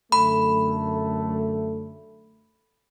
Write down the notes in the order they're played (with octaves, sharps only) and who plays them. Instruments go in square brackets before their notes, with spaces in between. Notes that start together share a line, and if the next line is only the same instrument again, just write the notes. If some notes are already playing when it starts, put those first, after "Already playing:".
[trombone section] F#2 D3 A3 [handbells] B5